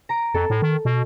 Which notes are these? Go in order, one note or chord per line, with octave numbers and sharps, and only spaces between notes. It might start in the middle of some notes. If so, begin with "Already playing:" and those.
A#5 D7
F2 A4
A2
D#3
B2